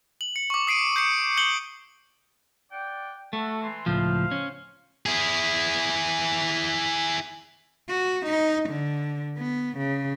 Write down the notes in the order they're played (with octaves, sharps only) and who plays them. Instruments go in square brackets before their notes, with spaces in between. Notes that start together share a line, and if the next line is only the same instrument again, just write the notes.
[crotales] F#7
C#7
C#6 D6
D#6 C7 D7 D#7
G6 C7 C#7
G6 C#7 F#7 G7
[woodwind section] D5 F#5 G5
[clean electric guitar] A3 [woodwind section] F#4 A4
[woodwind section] E3 C6
[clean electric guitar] C#2 A2 F3 [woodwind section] C5 F5
[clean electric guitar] C#4
[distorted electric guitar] E4 G#4
[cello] F#4
D#4
D3
B3
C#3